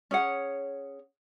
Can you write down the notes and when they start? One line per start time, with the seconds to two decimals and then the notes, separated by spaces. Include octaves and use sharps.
0.11 C#4 G#4 C#5 F#5